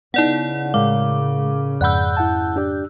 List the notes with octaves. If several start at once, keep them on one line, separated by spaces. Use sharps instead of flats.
C#3 B3 D#4 E4 D5 F#5
A2 G#3 A#4 F5 D6
F2 G#2 D5 F#5 B5 E6 F#6 G6
E4 F#5 A5
D4 G4 D5